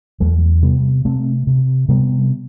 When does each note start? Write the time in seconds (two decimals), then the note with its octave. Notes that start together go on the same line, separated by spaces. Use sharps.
0.20 E2 F#3 A3
0.63 C3 G3 B3
1.05 C3 A3 C4
1.47 C3
1.89 C3 G3 B3